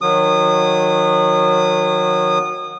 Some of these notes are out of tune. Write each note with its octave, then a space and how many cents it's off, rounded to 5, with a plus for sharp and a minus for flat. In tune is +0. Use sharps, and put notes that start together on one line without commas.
D#3 +0 F#3 -20 D#6 -25